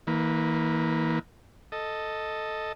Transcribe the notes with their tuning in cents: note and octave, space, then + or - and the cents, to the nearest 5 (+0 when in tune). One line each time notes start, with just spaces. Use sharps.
E3 -40 A#3 +0 B4 +0
A4 +0 D#5 +0